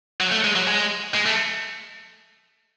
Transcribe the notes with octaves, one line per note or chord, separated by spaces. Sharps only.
F#3
A3
G#3
F#3
G#3
G#3
A3